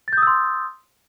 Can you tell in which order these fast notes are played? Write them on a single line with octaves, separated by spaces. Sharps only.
A6 G6 D#6 E6 C6